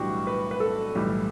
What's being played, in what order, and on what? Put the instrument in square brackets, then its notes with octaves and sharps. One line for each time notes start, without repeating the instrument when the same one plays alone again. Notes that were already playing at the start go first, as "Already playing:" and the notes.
Already playing: [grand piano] B1 A2 E3 G3 D4 F#4 G4
B4
B4
A4
B1 A2 E3 G3